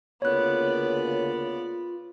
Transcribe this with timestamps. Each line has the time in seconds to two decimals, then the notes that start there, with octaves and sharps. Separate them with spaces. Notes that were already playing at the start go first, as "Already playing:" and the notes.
0.22 D2 C#3 A#3 B3 F4 C#5 D5 F#6